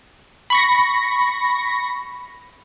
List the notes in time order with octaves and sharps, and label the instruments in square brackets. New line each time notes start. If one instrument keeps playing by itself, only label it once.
[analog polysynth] B5 C#6 A#6